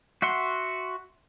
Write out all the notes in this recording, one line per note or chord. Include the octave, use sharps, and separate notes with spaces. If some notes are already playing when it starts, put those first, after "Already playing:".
F#4 E5 F#5 C6